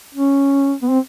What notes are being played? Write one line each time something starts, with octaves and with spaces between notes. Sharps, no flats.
C#4
B3
C4